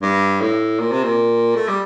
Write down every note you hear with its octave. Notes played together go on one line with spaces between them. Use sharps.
G2
A2
A#2
C3
A#2
A3
G3